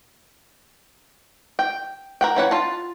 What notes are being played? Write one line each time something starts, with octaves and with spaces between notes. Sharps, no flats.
G5
A#4 F#5 G5
E3 C#4 F#5
F4 A5